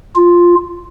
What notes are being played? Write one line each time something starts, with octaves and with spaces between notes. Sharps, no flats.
F4